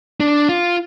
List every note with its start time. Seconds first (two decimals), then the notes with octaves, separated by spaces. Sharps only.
0.20 D4
0.49 F4